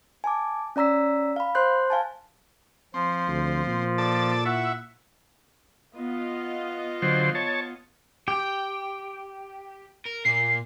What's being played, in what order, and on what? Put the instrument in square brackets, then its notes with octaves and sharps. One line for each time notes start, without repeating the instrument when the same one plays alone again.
[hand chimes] G#5 A5 D6
C#4 D5 A#5 E6 B6
F5 B5
C5 C6 F#6 G6
F5 G#5 A5
[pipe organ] F3 [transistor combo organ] C4
[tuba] D2
A#2
[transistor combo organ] A4 D5 A5
[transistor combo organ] E4 [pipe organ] E5 F#5 C#6
[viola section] B3 F4 D#5
[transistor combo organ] D3 F#3 C5
C#5 A5
[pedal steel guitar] G4 [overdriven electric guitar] G5
[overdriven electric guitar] A#4
[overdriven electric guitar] A#2 [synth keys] C7